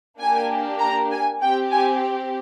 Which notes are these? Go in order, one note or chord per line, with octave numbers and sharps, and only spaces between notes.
A#3 D4 G4 G#5
A#5
G#5
C4 G4 G5
G#5